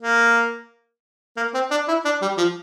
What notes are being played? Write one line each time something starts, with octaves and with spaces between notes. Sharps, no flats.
A#3
A#3
C4
D4
E4
D4
G3
F3